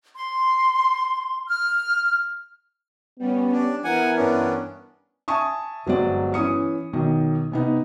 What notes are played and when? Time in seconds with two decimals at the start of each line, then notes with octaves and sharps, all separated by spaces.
0.16 C6
1.47 F6
3.19 G3 B3 C#4
3.52 D4
3.84 E3 B3 A#4 F#5 G#5
4.17 G2 B3 C#4 D4 A#4
5.28 E5 G#5 A5 C#6 D#6
5.87 G1 F#3 G#3 C4 D5
6.34 E3 C#4 D#6 C#7
6.93 B1 D#3
7.52 C3 B3 D#4